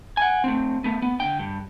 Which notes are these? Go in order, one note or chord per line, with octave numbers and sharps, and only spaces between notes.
F#5 G#5
A3 C4
A3 B3
B3
D3 G5
G2